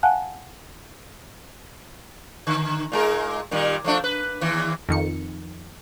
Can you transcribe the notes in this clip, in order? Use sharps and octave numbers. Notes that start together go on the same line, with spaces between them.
F5 F#5 G#5 A5 F#6
D3
A#2 G#3 A#4
A#2 D#3 G3
F3 A3 D4
B4
D#2 E3
F2 D#3 C#7